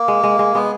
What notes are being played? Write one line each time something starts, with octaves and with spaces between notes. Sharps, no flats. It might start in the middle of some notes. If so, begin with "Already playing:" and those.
Already playing: A#3
G#3
G#3
G#3
G#3 B3